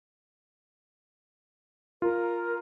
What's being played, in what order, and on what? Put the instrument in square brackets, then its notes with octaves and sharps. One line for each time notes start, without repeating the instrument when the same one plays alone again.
[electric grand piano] F4 [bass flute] A#4